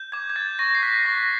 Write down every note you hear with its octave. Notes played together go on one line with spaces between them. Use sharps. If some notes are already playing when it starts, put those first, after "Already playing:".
Already playing: G6
D6 G#6
G#6
G6 A6
C#6 A#6
C7
F#6 B6
C#6 A#6
A#6